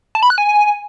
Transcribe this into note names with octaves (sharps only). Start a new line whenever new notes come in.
A5
B5
F#6
G#5